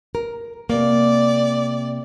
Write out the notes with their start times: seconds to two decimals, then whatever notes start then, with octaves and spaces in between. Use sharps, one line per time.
0.15 A#4
0.70 C3 A#3 D5